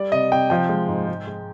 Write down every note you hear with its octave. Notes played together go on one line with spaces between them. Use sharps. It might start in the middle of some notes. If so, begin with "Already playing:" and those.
Already playing: G3 D5
C3 D#5
C3 G5
F3 G5
G#3
G#2
G#3
G#3